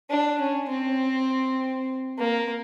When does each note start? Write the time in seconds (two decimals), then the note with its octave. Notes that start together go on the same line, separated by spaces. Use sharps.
0.10 D4
0.40 C#4
0.69 C4
2.18 A#3